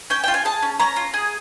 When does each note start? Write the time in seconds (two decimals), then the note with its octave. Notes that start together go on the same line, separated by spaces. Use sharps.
0.10 C#4 G5
0.24 F4 G5
0.34 G#5
0.45 G#4 A5
0.62 C#4
0.80 C#4 A#5
0.96 F4
1.14 G#4